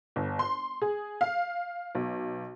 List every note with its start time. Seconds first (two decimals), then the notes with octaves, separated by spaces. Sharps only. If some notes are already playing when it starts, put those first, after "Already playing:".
0.16 G1
0.39 C6
0.82 G#4
1.21 F5
1.95 B1